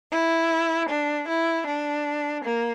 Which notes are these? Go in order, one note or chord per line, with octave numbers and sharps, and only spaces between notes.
E4
D4
E4
D4
A#3